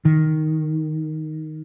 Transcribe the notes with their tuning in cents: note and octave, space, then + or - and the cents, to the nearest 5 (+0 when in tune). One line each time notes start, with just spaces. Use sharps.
D#3 +5